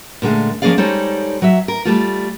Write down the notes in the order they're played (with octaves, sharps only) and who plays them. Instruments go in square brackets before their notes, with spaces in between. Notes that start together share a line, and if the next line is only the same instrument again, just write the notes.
[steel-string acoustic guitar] A#2 D3 G#3 A3
F3 A#3 C#4 G#4 D5 F5
G3 G#3 D#4 A4 C5 C#5
F#3 E5
A#4
G3 A3 F4